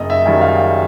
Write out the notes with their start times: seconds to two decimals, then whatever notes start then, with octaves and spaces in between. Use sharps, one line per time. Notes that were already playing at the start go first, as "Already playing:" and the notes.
Already playing: F#1 D#5
0.10 E5
0.25 F#2 D#3 G3
0.41 F5